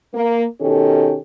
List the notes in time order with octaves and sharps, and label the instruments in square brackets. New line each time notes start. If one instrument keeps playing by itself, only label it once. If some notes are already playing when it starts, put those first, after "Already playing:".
[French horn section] A#3
B2 D#3 C#4 G4 A4